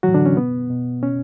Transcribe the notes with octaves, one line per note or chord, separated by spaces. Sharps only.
A2 E3 F#3 F#4
D3 D4
C#4
B2 B3
B2
B2 C#4